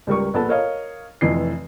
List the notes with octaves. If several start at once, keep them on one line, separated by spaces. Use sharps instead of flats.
C#2 G3 A#4 C#6
A#1 B3 A4 A5
A#4 C#5 D#5 F5
F1 F2 E3 C7